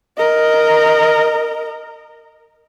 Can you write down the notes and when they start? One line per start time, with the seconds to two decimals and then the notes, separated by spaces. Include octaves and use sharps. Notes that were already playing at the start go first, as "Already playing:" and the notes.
0.17 A#4 D#5